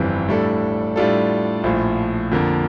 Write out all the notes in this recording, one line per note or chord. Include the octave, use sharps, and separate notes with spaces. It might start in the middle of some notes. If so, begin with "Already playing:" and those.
Already playing: G1 F2 E3 G3 C4
A2 G3 D4 A4
A2 G3 D4 F4 A4
A#1 A2 F3
F2 D3 F3 A#3